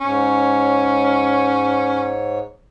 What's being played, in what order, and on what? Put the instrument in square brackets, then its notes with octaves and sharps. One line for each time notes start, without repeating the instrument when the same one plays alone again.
[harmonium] G#2 C#5 [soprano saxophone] C#4